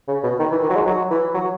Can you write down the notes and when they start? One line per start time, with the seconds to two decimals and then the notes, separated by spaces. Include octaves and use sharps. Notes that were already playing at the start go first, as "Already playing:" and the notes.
0.08 C#3
0.23 B2
0.40 D#3
0.51 E3
0.63 D#3
0.70 F#3
0.75 G#3
0.87 F#3
1.11 E3
1.34 F#3